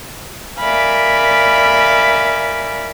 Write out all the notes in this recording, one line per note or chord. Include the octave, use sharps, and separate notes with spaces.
A#4 D5 E5 F5 G#5 B5